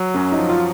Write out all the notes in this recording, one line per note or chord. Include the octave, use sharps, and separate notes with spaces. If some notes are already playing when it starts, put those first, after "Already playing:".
Already playing: F#3
F#2 C#4
D#4
F3
F4